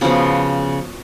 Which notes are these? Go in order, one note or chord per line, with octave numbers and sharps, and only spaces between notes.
C#3 F3 B3 F#4